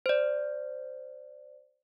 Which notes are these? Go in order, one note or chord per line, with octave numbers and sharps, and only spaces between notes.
C5 D5